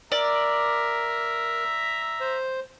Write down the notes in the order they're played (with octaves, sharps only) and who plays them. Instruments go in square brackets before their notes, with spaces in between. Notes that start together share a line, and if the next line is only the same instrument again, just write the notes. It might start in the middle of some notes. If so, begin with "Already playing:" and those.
[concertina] A#4 [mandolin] D5 [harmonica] E5 A#5
[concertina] C5